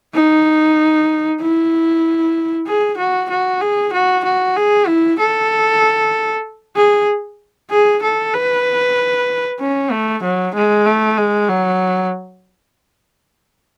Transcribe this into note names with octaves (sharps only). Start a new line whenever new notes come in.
D#4
E4
G#4
F#4
F#4
G#4
F#4
F#4
G#4
E4
A4
G#4
G#4
A4
B4
C#4
A3
F#3
G#3
A3
G#3
F#3